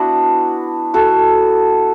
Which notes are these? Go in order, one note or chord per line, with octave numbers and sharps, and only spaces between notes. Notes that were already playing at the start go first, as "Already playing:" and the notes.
Already playing: B3 D4 E4 F#4
F#4 A4